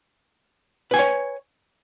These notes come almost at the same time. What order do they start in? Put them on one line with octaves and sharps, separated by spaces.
B4 G#5 G5 C#5